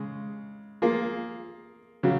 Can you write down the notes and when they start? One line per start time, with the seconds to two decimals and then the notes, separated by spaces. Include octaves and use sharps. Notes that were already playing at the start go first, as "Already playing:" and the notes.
Already playing: C#3 G#3
0.82 A#3 F4 G#4
2.03 C#3 F#3